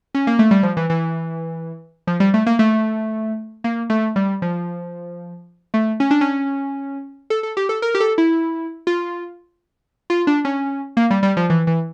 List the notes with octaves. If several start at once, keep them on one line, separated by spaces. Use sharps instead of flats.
C#4
A#3
A3
G3
F3
E3
E3
F3
G3
A3
A#3
A3
A#3
A3
G3
F3
A3
C#4
D4
C#4
A4
A4
G4
A4
A#4
G4
A4
E4
F4
F4
D4
C#4
A#3
G3
G3
F3
E3
E3